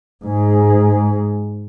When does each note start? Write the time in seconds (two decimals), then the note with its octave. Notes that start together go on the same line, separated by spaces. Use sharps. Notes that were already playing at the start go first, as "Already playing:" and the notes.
0.24 G#2 G#3